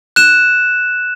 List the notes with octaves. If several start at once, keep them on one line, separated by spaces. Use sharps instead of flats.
F#6 E7